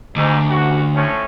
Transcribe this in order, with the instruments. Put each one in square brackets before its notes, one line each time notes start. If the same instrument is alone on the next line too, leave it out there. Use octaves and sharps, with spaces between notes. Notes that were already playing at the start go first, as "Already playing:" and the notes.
[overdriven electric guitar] D2 [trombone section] G#2
[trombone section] A1 F#4
A2 F3 C#4